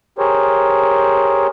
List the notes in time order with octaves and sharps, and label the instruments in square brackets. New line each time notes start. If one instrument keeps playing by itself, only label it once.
[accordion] G4 G#4 A#4 C5 C#5